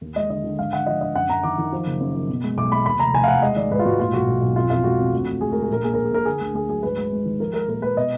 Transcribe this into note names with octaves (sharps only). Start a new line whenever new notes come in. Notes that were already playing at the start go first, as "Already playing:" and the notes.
D#2
G#3 D#5
D3 D#5
D3
G#1 F5
D3 F#5
F3 D#5
D3 D#5
F#2 F#5
F#2 A#5
D#3 D6
D#3
F3
F#1
F#2
F3
B2
G#3
B1 D6
G#3 B5
D#2 B5
F1 A#5
F1 G#5
F5
D#2 F#5
G#3 D#5
D#3 D5
G#2 B4
F4
G#2 F#4
A#2 F4
B1 F#4
B1
B1
F2 F4
F2 F4
G#3 F#4
F2
D2
D2
D2 G#4
G#3 A#4
G#4
A#1 A#4
A#2 G#4
A#1 A#4
G#4
A#2 A#4
D3 G#4
D2
D2 G#4
F#3 G#4
G#1 B4
G#3
G#3
D#3
F3 A#4
G#3 A#4
A#2 A#4
G#3 B4
B2 D#5